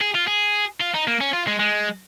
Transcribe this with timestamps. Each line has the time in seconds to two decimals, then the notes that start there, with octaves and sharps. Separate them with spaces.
0.01 G#4
0.15 F4
0.28 G#4
0.81 F4
0.94 D#4
1.07 A#3
1.21 C#4
1.33 F4
1.47 G#3
1.59 G#3